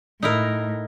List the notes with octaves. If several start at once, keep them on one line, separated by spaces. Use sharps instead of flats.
A2 D#4 E4 A#4